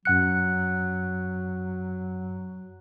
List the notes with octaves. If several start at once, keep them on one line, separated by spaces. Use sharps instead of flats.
F#2 F#3 F#5 F#6 C#7